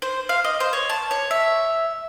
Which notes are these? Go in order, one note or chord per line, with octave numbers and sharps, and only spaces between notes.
C5
F5
D#5
C5
C#5
A5
C#5
E5